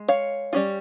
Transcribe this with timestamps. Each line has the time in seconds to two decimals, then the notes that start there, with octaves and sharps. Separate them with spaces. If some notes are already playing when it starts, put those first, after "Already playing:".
Already playing: G#3
0.08 C#5 F5
0.53 G3 C#4 F4